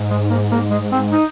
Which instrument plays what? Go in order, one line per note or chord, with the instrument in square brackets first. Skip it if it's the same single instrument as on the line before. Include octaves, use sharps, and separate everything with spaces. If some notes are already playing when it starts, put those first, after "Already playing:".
Already playing: [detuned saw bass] G#2
[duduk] G#3
A#3
A#3
G#3
C4
D#4